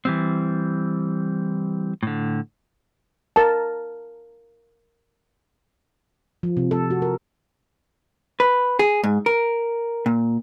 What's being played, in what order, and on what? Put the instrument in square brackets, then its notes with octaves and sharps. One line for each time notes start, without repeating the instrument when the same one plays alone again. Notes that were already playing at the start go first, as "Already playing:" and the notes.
[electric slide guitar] E3 G3 C4
A2 D3
[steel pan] A#4 A5
[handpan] F3
C3
A4
F#4
A#4
[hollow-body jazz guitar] B4
G#4
G#2
A#4
A#2